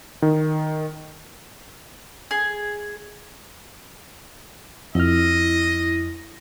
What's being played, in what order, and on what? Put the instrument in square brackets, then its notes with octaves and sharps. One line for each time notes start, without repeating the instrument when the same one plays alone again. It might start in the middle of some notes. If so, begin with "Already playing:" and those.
[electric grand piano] D#3
[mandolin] G#4
[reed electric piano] F2 F6 [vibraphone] E4 [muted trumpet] D#5